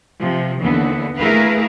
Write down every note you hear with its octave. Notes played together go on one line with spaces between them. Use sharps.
C3 F3
D#2 D3 E3 B3
A3 E4 G#4 A#4 B4 F5